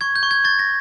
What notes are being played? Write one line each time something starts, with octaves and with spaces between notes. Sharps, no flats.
C#6 G#6
G6
C#6
G#6
C#6 A6
A#6